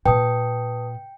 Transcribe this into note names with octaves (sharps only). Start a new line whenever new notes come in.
A#2 A#3 B4 G5 A5 D#6